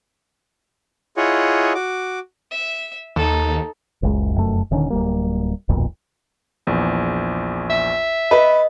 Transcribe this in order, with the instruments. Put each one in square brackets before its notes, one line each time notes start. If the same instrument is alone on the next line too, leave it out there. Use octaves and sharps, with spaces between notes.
[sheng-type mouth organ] E4 F4 G#4 C#5 D#5 F#5
F#4 D6
[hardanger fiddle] E5
[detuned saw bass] D#2 [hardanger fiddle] D#4 A4
[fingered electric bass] F#1 C#2 F#2 G#3
F1 F#2 A3
D#1 D3 D#3 C#4
D1 G1 G3 A#3
D#1 B1 F2 A#2
[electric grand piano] A#1 E2
[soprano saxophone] E5
[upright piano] B4 [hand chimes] D#5